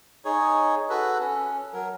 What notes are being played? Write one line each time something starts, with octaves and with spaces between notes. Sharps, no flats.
D#4 G#4 C#5
F#4 A4 B4
C#4
F#3 A#4